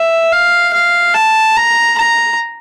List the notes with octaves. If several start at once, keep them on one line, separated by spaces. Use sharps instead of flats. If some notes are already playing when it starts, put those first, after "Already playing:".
Already playing: E5
F5
F5
A5
A#5
A#5